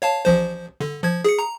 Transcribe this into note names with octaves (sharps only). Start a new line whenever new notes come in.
C#5 F5 A5
A1 F3 C5
D3
F3 G#6
G#4 C#7
A#5